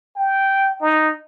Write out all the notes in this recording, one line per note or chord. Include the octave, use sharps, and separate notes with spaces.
G5
D#4